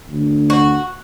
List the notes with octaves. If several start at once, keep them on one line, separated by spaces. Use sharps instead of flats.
D2
F#4